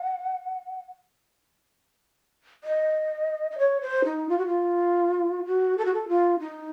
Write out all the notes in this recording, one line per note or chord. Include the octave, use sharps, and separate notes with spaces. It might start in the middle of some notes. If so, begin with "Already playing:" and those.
Already playing: F#5
D#5
D#5
C#5
C5
D#4
F4
F#4
F4
F#4
A4
F#4
A4
F4
D#4